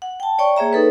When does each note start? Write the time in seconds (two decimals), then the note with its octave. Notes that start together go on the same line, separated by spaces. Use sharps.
0.02 F#5
0.20 G5 A5
0.39 C#5 D5 G5 C#6
0.57 A#3 G#4 C#5 E5 A#5
0.73 D#4 A4 B4